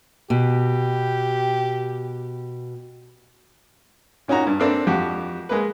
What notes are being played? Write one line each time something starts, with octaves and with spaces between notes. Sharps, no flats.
B2 G4
A#2 C#4 D#4 F#4 A#5
G2
A#3 C4 D4 A4 B4 F5
F2 F#4 G4
G#3 A#3 B4